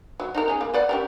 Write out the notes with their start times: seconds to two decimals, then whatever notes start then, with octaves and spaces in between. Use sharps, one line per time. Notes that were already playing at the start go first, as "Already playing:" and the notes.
0.20 F#3
0.34 D#4 F#4 A#4
0.48 C#4 G#4
0.61 A#3
0.74 B4 D5 F#5
0.89 C#4 G4 A#4